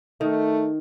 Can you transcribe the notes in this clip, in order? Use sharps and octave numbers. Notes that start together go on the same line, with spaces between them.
D#3 A3